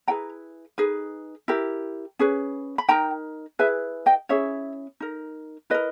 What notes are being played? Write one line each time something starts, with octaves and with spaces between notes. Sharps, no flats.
E4 G#4 B4 G5 A#5
D#4 G#4 B4
E4 G4 A#4
C#4 G#4 B4
B5
D#4 A#4 G5 A#5
E4 G#4 B4 E5 G#5
D#5 G5
C#4 E4 G#4 C#5 E5
D#4 A#4
E4 A#4 B4 D#5